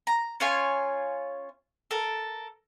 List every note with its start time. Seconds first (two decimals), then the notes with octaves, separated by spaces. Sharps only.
0.07 A#5
0.40 C#4 F4 C#5 G#5
1.91 A4 A#4